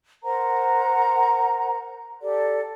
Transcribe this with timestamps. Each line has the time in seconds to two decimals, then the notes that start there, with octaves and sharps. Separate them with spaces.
0.24 A#4 C5 F#5 A#5
2.21 G4 A4 D5